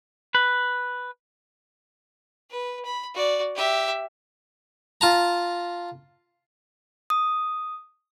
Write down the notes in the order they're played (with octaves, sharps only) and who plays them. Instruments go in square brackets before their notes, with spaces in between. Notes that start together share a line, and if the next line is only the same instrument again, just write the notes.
[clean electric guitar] B4
[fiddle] B4
B5
F#4 D5
G4 E5
[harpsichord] F4 A5 A#5
[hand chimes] D#6